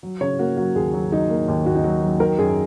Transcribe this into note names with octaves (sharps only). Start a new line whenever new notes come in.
F#3
C#3 C#5
A#3 F#4
F#3 F#4
D#2 G#4
F#3
F#3 D#4
A#3
D#2
D#2 F#4
D#4
F#3 F#4
F#3
D#3 A#4
F#2 G#4